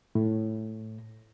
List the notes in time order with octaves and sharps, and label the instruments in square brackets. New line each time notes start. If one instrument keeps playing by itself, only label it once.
[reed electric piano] A2